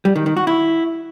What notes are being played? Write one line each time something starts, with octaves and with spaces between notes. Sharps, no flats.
G3
D#3
D#3
F#4
E4